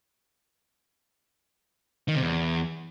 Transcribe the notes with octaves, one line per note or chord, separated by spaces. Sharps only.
D#3
C3
E2